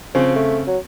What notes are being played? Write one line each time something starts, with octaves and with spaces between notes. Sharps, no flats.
C#3 F3 C4
A3
F#3